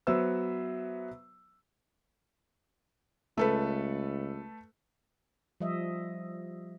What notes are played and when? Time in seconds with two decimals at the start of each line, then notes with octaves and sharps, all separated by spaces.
0.07 F#3 B3 B4 C5 E5 E6
3.38 C#2 A3 A4 B4
5.60 F3 G3 D#5 E5